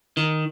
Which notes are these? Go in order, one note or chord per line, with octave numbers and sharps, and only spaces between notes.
D#3